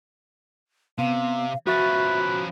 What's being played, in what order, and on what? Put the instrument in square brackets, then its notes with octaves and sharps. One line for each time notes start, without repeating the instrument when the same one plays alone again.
[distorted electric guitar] C3 [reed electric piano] B3 [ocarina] F5
[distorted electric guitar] F3 C#4 [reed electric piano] F#4 C#6 A6 [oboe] B4 [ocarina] E5